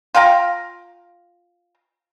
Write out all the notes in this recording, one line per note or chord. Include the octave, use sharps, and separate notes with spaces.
F4 F5 G5 A#5